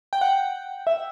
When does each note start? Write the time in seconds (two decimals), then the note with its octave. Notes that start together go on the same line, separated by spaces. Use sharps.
0.13 G5
0.21 F#5
0.87 E5